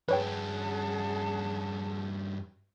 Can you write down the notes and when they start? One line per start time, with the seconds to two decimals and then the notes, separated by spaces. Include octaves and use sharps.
0.09 G2 C#4 G#4 B4 C#5 F#5 G5 A5